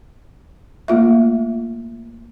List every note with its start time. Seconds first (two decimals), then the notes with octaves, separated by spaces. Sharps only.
0.88 A3 A#3 F4 E5